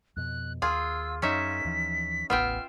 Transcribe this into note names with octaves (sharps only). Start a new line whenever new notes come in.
F2 B2 F#6
D#2 F4 G#4 E6
F#2 C#4 D#4 E5 B6
D#2 E3 F3
E1 A1 B3 F4 E5 G5 F6